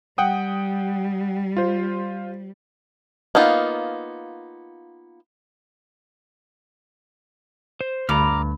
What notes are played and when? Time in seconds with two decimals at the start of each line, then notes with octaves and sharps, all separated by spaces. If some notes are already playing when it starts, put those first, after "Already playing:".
0.18 G3 F#5 G5 D#6
1.57 F4 C5
3.35 A#3 B3 D#4 F4
7.81 C5
8.09 D2 G2 A#5 D6 F6